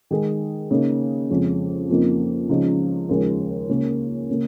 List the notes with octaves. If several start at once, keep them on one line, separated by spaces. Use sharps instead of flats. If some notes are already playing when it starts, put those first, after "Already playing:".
D#3 G#3 D#4 G#4
C#3 A#3 D#4
F2 C#3 F3 G#3
F2 C#3 F3 A#3 D#4
C#2 C#3 F3 G#3 D#4
D#2 C#3 F3 G#3
C#2 C#3 A#3 C#4
C#3 A#3